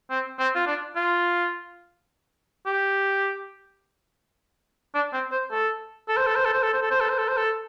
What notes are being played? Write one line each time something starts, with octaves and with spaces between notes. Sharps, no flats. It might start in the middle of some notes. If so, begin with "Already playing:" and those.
C4
C4
F4
D4
F4
G4
D4
C4
C5
A4
A4
C5
A4
C5
A4
C5
A4
C5
A4
C5
A4
C5
A4
C5
A4